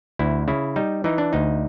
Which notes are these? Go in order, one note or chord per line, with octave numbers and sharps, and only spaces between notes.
D2 E4
C#3 E4
G3 D#4
E3 D#4
D4
D2 D#4